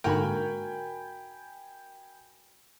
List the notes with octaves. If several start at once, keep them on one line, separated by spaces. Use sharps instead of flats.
G#2 D3 A#3 F#4 A#4 G5 G#5 B5